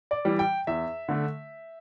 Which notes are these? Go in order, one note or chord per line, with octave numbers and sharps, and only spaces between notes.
D5
E3 G3
G5
E2 E5
D3 A3